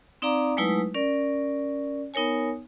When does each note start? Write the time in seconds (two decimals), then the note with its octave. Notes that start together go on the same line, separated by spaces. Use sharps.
0.22 C4 D#4 D5 F5 A#5 D6
0.57 F#3 G#3 A3 D#4 E4 B4
0.94 C#4 A#4 D5
2.14 B3 D#4 A#4 C#5 G#5